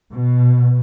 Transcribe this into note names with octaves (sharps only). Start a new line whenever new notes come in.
B2